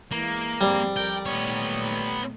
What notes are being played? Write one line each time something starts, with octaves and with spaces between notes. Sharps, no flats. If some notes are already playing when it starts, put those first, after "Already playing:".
E3 G#3 A#3
G#2 F3 G3 C4
F2 A#4 D5 G5
A#2 D#3 A3 B3 C#5